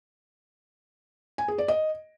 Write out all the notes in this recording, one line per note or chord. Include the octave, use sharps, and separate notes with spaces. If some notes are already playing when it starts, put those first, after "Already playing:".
G#5
G#4
D5
D#5